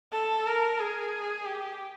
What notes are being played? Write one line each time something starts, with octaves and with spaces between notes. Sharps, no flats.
A4
A#4
G#4
G4